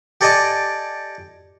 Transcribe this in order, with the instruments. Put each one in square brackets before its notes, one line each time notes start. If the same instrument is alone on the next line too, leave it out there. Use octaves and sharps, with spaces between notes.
[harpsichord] G4 A4 D5 D#5 G#5 A5